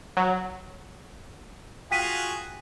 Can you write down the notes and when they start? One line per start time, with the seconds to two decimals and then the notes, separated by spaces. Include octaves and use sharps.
0.17 F#3
1.91 F4 F#4 G#4 G5 B6 D#7